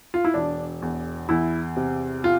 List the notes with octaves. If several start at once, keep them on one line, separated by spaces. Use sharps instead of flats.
F4
E4
E1 D4
E2
E2 E4
C3
F4